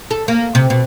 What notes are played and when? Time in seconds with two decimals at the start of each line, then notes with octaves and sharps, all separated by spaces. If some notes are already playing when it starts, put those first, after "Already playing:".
0.11 A4
0.28 A#3
0.55 C3
0.70 B2